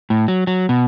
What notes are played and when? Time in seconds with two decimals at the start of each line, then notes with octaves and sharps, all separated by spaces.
0.10 A2
0.28 F#3
0.47 F#3
0.69 B2